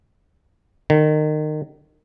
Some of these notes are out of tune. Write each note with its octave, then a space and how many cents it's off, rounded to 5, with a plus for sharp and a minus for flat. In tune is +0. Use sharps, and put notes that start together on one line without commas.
D#3 -30